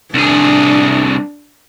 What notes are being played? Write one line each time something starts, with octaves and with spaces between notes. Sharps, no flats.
C2 D4 G#4